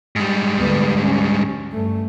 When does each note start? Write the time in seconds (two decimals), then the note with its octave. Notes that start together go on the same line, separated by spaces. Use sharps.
0.16 G#2 G3
0.59 D2 B3
1.06 C#4
1.72 G2 A3